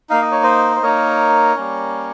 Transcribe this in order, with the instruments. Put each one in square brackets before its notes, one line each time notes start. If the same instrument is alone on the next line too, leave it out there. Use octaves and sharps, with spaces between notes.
[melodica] A#3 D#4 F5
D#5
C#5
C5 D#5
C5
A#3 D#4 A#4 C#5
G3 A#3 C#4